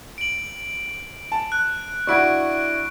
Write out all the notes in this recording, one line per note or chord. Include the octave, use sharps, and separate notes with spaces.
D7 F#7
A5
F#6
D4 E4 F#4 C#6 D7